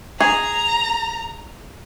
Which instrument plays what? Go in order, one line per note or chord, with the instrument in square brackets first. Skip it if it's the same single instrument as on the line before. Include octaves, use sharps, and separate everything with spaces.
[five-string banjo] G#4 [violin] A#5